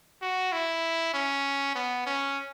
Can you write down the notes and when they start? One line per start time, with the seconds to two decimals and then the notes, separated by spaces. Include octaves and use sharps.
0.22 F#4
0.52 E4
1.14 C#4
1.75 B3
2.06 C#4